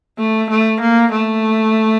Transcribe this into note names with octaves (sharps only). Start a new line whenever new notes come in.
A3
A3
A#3
A3